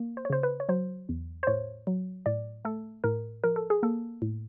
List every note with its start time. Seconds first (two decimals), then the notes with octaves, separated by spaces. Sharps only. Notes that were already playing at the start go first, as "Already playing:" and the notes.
Already playing: A#3
0.17 C5
0.25 C#5
0.30 C#3 C5
0.43 B4
0.60 C#5
0.69 F#3 C5
1.09 E2
1.43 C5
1.47 A2 C#5
1.87 F#3
2.26 A2 D5
2.65 A3 A4
3.04 A2 A#4
3.44 F3 A#4
3.56 A4
3.70 G#4
3.83 A#3 A4
4.22 A2